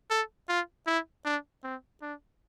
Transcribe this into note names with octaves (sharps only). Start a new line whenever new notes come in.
A4
F4
E4
D4
C4
D4